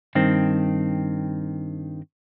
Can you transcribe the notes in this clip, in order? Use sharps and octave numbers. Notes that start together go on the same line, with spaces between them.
G2 D#3 C4